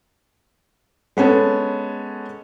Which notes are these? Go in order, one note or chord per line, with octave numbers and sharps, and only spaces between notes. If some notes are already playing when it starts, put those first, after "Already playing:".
G#3 B3 C#4 A4